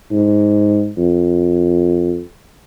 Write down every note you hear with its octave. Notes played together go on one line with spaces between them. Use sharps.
G#2
F2